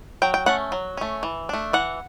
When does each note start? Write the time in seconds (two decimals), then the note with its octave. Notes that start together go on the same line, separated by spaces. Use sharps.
0.22 F#3 G5
0.34 G5
0.46 A3 C#4 F#5
0.72 F#3
0.97 A3 C#4
1.23 E3
1.49 A3 D4
1.73 E3 F#5